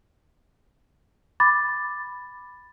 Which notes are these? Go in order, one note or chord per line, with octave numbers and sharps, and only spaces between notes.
B5 D6 A6